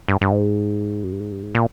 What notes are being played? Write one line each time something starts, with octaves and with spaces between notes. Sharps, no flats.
G2
G2
G#2
F#2
G2
G#2
G2
G#2
A#2